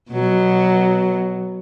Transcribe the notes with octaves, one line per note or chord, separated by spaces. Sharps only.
B2 F#3 B3